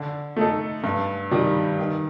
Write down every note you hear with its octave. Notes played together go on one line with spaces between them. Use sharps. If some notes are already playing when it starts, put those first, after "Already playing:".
Already playing: D3
A3 D#4 A4
G2
D#3 G3
D#3